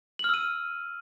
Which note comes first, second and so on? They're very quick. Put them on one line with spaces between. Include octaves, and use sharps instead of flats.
F#7 F6 E6 D#7